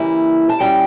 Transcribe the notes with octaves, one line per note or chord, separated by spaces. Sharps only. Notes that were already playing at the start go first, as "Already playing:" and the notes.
Already playing: C#3 E3 G3 A#3 E4
A5
A#2 G3 C#4 E4 G5